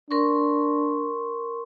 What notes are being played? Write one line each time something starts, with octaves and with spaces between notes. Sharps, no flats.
D4 A#4 C6 C#6